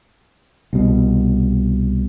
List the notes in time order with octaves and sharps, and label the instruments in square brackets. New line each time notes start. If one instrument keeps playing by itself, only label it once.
[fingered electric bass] C2 B2